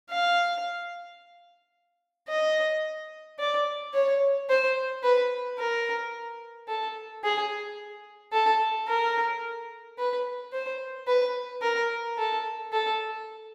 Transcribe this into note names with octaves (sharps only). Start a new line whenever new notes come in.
F5
D#5
D5
C#5
C5
B4
A#4
A4
G#4
A4
A#4
B4
C5
B4
A#4
A4
A4